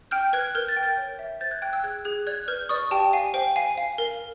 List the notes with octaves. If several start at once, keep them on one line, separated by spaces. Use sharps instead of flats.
G5 F6 G6
B4 F#6 G#6
A#4 F6 G6
G6 A6
G5
G6 A6
C#5
E5
C5 G6 A6
F#6 G#6
G5 F#6 G#6
E6 F#6
G#4 F#6 G#6
G#4 F#6 G#6
D5 F#6 G#6
B4 F6 G6
D5 C#6 D#6
G4 G5 A5
F5 G#5
C5 G5
F5 G#5
F5
A#4